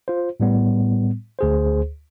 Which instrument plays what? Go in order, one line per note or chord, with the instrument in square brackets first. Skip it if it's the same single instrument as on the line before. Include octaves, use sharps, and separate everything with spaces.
[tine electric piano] F4 C5
A2 G3 B3
D2 G#4 C5